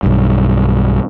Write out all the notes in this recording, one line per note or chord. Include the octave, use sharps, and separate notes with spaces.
B1 G2